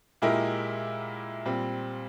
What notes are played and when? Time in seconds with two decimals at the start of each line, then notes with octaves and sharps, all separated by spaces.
0.22 A#2 G#3 E4 G4 A#4
1.45 A#2 G3 C4